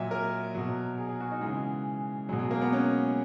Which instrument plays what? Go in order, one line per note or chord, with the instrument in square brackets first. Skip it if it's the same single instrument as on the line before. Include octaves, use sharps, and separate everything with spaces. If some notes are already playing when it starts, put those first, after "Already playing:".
Already playing: [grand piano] A#2 F#3 D#5 E5
A#4
B2 F#3
G#4
G#4
F#4
D#4
C#3 E3 G#3
F#3 G#3
B2
G#3
A#3
B3
C#4